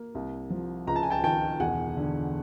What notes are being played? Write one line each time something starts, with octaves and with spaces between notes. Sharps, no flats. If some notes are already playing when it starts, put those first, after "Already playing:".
Already playing: A#3
C2
F3
C#2 A#5
A5
G#5
G5 A5
D#3 G5 A5
E1 F#5 G#5
D3